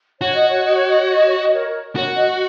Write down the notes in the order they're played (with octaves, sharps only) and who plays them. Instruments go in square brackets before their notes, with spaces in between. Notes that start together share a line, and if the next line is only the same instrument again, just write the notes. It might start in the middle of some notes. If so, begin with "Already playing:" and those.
[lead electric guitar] F#4 [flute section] C#5
[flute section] D#5
C#5
D#5
C#5
D#5
C#5
D#5
C#5
D#5
A#4 C#5
[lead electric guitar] F#4 [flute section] A#4 C#5
[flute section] D#5 F#5